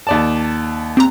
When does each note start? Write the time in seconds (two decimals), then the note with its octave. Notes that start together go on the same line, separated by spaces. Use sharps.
0.07 D#2 D5 A5
0.97 C4 G4 A#5